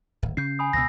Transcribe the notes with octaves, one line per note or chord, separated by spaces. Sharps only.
D1 G#1
C#3 C#4 G6 C7
G#5 B5 D#6
C#2 B2 E6 A#6